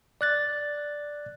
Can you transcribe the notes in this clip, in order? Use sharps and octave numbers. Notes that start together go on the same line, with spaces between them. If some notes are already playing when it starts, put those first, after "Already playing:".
D5 F#6 A6